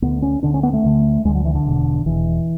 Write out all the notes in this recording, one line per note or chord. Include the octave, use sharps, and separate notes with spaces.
D2 D3 B3
C#4
D2 D3 D4
C#4
B3
A3
D2 D3
D2 D3 G#3
F#3
E3
D3
E1 E2 B2
E1 E2 B2 E3